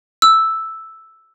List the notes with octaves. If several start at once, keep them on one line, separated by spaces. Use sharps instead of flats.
E6